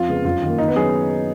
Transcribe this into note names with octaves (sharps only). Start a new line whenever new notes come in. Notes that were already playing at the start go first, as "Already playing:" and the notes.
Already playing: F2 F4
C#3 G#3 B3
F#2 F4
D#3 A#3
D#3 D#4
B3
F#3 C#4 G#4